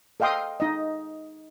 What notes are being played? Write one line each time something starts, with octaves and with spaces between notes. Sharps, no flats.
A4 D#5 F5 G5 C6 D#6
D#4 D#5